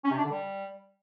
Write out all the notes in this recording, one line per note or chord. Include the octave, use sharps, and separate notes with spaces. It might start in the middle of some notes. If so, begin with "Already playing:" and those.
C#4
C3
D4
D3
G3